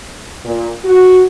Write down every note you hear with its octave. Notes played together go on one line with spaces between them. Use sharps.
A#2
F#4